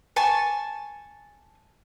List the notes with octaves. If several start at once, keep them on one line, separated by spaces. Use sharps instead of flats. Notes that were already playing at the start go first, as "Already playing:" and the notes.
G#5 A5 C#6